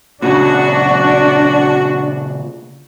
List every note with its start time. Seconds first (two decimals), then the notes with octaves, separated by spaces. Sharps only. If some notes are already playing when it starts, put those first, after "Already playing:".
0.22 A#2 C#3 D4 F#4